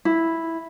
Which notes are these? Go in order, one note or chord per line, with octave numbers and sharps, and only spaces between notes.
E4